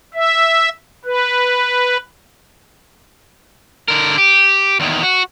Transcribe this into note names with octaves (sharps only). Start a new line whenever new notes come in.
E5
B4
D3 A#4
G4
E2 D#3
F#4